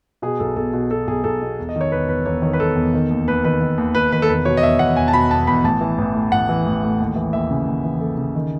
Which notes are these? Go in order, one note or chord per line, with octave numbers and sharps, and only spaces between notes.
B2 G#4
B1 A4
B1 A4
B2
B2 A4
B1 G#4
B1 A4
B2
E1
D#5
D#3 C#5
E1 B4
E2 B4
E1 C#5
D#3 C#5
B4
E1 A4
E2
D#3
D#2
D#2 B4
D#3 B4
D#3
D#2
D#2 B4
D#3 B4
A4
E1 B4
B2 C#5
D#5
E1 E5
E2 F#5
E1 G#5
A5
B2 B5
E1 A5
E2 B5
A1 A5
E3
A1
A2
A1 F#5
E3
A1
A2
D#2
E3
D#2 E5
C#3
D#2
E3
D#2 A4
C#3
D#3